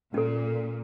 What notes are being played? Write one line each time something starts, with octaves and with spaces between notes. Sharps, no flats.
A#2 C#4 A4